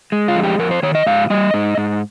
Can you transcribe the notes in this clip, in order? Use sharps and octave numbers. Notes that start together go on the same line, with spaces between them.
G#3
F4
F2
G4
F2 A#4
C5
D#3 C#5
D#5
G#2 F5
G3 D#5
G#2
G#2